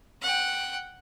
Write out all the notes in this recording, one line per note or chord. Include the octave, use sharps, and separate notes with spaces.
F#5 G5